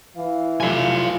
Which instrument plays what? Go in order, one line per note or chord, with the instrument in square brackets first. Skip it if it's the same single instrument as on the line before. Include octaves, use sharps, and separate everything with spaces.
[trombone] E3 [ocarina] F5
[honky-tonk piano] F1 B1 E4 [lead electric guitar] F4 G#5